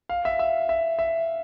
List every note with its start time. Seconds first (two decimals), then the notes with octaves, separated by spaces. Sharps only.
0.09 F5
0.25 E5
0.39 E5
0.69 E5
0.99 E5